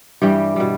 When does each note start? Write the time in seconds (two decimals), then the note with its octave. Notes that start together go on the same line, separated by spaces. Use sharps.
0.22 G2 E3 G3 G4
0.56 B2 G3